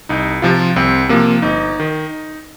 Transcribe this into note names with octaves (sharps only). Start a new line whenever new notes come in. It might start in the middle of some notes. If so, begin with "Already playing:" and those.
C2 D#4
C3 F3 F4
C2 C4
C3 F3 A#3
G1 D#4
D#3